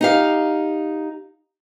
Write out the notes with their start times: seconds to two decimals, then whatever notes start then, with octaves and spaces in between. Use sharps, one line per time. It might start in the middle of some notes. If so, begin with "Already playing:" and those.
0.01 D#4 G4 F5